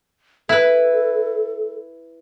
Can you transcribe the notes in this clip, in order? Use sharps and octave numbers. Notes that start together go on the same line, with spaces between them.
E4 A4 B4